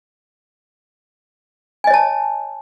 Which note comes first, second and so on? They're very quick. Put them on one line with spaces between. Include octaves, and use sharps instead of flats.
G#5 D#5 C#5 A5